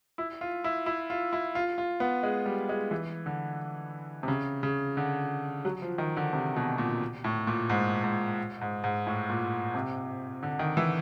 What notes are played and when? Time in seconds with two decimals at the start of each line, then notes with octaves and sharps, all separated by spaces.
0.18 E4
0.41 F4
0.64 E4
0.86 E4
1.10 F4
1.33 E4
1.55 F4
1.78 F4
2.00 B3
2.23 G#3
2.46 G3
2.69 G#3
2.91 E3
3.26 D3
4.23 C3
4.28 C#3
4.63 C#3
4.97 D3
5.65 F#3
5.82 F3
5.98 D#3
6.17 D3
6.33 C3
6.56 B2
6.78 A#2
7.24 A2
7.47 A#2
7.70 G#2
8.04 G#2
8.61 G#2
8.84 G#2
9.07 A2
9.30 A#2
9.75 C3
10.43 D3
10.59 D#3
10.77 E3